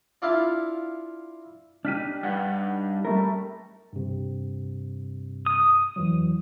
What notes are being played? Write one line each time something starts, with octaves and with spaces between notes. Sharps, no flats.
D4 E4 F4 F5 A5
D4 D#4 G4 F6 B6 D#7
G2 F#5
G3 A3 A#4
G2 C3
D#6
F2 E3 F#3